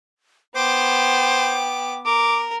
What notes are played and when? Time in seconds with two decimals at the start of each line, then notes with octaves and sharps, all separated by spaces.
0.56 B3 C5 G5 D6
2.05 A#4 D6